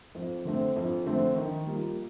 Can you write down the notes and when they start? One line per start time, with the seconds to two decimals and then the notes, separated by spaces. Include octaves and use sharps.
0.15 F2
0.45 D3 A3 C4
0.76 F2
1.06 D3 A3 C4
1.36 D#3
1.66 G3 A#3 F4